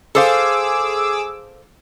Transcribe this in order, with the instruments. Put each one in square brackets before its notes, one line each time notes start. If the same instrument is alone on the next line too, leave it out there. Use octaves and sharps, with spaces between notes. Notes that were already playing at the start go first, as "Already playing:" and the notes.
[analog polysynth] G#4 D6 E6 [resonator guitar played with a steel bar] A4 C5 F5